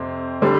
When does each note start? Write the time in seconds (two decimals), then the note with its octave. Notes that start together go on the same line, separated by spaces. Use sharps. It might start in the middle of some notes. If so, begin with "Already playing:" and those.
Already playing: F2 C3 C4
0.42 D3 G3